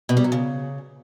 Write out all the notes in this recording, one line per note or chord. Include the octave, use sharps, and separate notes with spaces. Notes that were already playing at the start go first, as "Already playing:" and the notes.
B2
G3
F#3
C#3